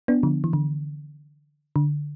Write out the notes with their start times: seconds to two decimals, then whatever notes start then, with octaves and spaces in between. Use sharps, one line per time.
0.08 B3 D4
0.23 D3 F3
0.44 E3
0.53 D3
1.76 D3